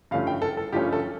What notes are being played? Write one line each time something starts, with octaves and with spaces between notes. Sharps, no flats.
G2 F3 A3 C#4 F5
G5
A4
A4
G2 F3 A3 C#4 G4
A4